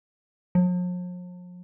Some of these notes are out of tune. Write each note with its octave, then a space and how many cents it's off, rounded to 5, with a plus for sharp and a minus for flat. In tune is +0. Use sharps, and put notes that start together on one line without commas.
F3 +45